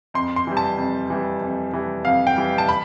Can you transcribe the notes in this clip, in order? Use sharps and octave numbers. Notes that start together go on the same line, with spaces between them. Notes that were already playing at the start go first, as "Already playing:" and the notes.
F2 C6
C6
E3 G3
A5
F2
E3 G3
F2
E3 G3
F2 F5
G5
E3 G3
A5
B5